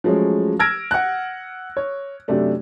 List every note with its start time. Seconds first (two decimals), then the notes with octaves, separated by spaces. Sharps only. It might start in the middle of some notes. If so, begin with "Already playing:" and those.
0.04 F3 F#3 G#3 A3 C#4
0.59 E6 F6 G#6 A#6 D7
0.91 F#5 F#6
1.77 C#5
2.28 F#2 C3 A3 D4